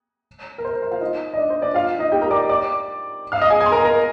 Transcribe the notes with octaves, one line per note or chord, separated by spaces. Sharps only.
A#4
C5
A#4
C5
F4 F5
D#4 D#5
D#5
D4 D5
C5
D4 D5
F4 F5
D#4 D#5
G4 G5
A#4 A#5
D5 D6
D5 D6
F5 F6
D#5 D#6
G#4 G#5
G#4 G#5
C6
A#4 A#5
A#4 A#5